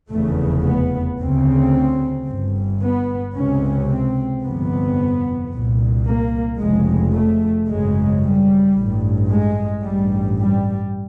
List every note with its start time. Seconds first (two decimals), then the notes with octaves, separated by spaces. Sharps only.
0.10 F1 E2 C#3 A3
0.64 B3
1.19 D2 C#3 C4
2.27 G1 G2
2.82 B3
3.36 C#2 C3 C#4
3.90 C4
4.43 G1 F2 C3 B3
5.52 C2 A#2
6.05 A#3
6.59 F1 F2 C#3 G#3
7.13 A3
7.68 G#1 F#2 C#3 G#3
8.22 G3
8.75 A1 G2
9.30 G#3
9.83 A1 G2 G3
10.38 G3